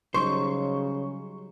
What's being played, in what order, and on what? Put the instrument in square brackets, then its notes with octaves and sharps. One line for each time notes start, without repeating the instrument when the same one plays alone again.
[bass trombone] C#3 [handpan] F#3 G3 D#4 [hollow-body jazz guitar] C5 [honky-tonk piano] C#6